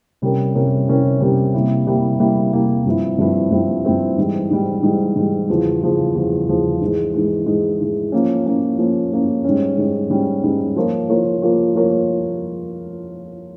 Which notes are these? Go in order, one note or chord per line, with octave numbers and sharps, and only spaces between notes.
C3 G3 C#4 G4 A#4
C3 G3 C#4 G4 A#4
C3 G3 C#4 G4 A#4
C3 G3 C#4 G4 A#4
C3 G3 A#3 E4
C3 G3 A#3 E4
C3 G3 A#3 E4
C3 G3 A#3 E4
G2 F3 C4 E4
G2 F3 C4 E4
G2 F3 C4 E4
G2 F3 C4 E4
G#2 E3 G3
G#2 E3 G3
G#2 E3 G3
G#2 E3 G3
E2 C#3 F3
E2 C#3 F3
E2 C#3 F3
E2 C#3 F3
G#2 E3 G#3
G#2 E3 G#3
G#2 E3 G#3
G#2 E3 G#3
F3 A#3 C#4
F3 A#3 C#4
F3 A#3 C#4
F3 A#3 C#4
G#2 G3 C#4
G#2 G3 C#4
G#2 G3 C#4
G#2 G3 C#4
F3 A#3 F4 A#4 C#5
F3 A#3 F4 A#4 C#5
F3 A#3 F4 A#4 C#5
F3 A#3 F4 A#4 C#5